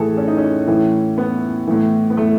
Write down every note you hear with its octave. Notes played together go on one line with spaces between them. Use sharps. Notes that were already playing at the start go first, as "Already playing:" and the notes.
Already playing: A2 E3 G#4 A4
C#4
D#4
C#4
A2 E3
B3
A2 E3
B3
A3